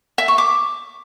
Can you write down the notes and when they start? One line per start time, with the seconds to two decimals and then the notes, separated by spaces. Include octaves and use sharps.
0.18 E5
0.28 C#6
0.38 D6